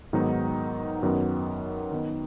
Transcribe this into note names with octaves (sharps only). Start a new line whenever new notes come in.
G#2 D#3 F#3 B3 D#4
F#2 D#3 F#3 B3
D#3 B3 D#4